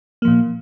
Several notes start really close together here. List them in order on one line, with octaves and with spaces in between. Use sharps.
A#3 F3 A#2